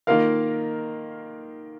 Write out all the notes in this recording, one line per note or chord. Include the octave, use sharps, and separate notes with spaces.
D#3 A#3 F4 A#4 F5